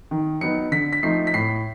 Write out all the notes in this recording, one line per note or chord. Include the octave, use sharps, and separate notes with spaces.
D#3
F#3 B3 D#4 C#7
D3 B6
B6
F3 A3 C4 D#4 C7
B6
A2 C7